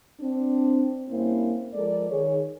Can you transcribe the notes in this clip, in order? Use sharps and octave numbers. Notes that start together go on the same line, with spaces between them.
C4 D4
G2 A#3 C4 C#4 E4 C5
F3 G#3 A4 A#4 D5
D#3 G#4 C#5